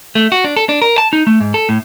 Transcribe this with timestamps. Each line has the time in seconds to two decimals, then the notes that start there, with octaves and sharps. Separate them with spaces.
0.15 A3
0.32 F#4
0.44 D4
0.57 A4
0.69 D4
0.82 A#4
0.98 A5
1.13 D#4
1.27 A3
1.40 G#2
1.54 A4
1.69 A2